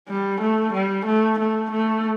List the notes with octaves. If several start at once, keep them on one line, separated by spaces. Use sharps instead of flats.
G3
A3
G3
A3
A3
A3